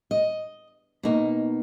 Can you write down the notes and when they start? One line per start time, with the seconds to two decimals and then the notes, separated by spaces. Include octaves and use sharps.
0.11 D#5
1.03 B2 A#3 D#4